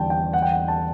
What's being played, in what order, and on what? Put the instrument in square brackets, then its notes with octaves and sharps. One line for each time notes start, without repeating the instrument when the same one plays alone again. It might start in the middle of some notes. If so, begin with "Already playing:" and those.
Already playing: [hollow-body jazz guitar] E2 D3 G3 [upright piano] G5 A5
[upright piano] G5
F#5
G5
F#5
A5